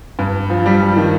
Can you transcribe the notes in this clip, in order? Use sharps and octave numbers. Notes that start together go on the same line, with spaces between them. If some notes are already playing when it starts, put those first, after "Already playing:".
G2
F3
G3
F3
D#3